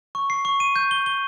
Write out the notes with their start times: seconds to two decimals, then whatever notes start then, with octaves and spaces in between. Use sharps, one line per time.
0.15 C#6
0.30 C7
0.45 C#6
0.60 D#7
0.76 G6
0.91 G7
1.06 G7